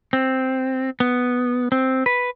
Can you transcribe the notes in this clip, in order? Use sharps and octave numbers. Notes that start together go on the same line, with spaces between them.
C4
B3
C4
B4